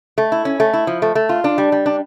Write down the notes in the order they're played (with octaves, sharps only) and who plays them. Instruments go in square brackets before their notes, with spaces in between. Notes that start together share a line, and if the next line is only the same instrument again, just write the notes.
[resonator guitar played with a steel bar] A3
E4
C#4
A3
E4
F3
A3
A3
F4
D4
G3
G3
D4